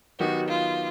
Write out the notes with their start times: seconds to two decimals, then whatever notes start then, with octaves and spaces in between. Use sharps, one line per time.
0.20 D#3 F#3 B3 D#4 F#4 G4
0.49 F4